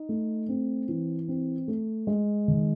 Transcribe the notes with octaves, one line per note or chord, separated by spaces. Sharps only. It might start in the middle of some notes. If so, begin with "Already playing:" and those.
Already playing: D#4
A3
C4
E3
C4
A3
G#3
D#3